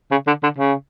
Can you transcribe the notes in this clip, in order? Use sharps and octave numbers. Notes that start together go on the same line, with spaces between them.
C#3
D3
D3
C#3